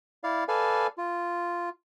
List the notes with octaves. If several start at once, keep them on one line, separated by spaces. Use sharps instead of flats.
E4 D5 F5
A4 B4 D5 F5 G#5
F4